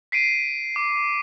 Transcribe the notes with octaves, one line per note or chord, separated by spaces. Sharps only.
B6 C7 D7 D#7
D6